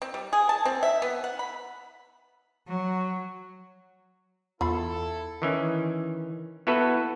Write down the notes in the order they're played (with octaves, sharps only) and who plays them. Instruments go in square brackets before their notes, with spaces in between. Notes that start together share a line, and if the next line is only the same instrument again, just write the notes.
[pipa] C4
G3
G#4
A5
C4
E5
B3
F#5
B5
[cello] F#3
[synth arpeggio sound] E2 [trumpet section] E4 A4 [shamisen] F4 F5 B5
[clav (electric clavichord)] D#3 E3 C#4
B3 E4 F#4 A4 B4